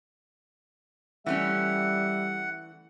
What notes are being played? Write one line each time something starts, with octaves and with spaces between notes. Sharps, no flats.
E3 G3 A3 C#4 E5 F#5